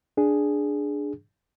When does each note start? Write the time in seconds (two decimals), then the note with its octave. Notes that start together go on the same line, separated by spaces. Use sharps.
0.17 D4 G#4